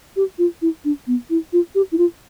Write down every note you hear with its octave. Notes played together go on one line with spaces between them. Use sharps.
G4
F4
E4
D4
B3
E4
F4
G4
E4
F4